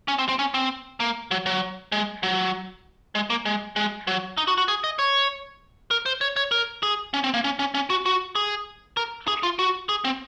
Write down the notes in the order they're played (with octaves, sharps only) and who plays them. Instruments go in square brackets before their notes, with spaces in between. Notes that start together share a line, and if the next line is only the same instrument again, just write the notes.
[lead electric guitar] C#4
C4
C4
C#4
C4
A#3
F#3
F#3
G#3
F#3
G#3
A#3
G#3
G#3
F#3
D#4
F#4
F#4
G#4
D#5
C#5
A#4
C5
C#5
C#5
A#4
G#4
C#4
C4
A#3
C#4
C#4
C#4
F#4
F#4
G#4
A#4
G#4
F4
F#4
G#4
C4